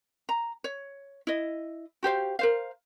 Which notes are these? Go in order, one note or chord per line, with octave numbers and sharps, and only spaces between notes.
A#5
C#5
E4 D#5
F#4 G4 C5 F5
A#4 C5 F5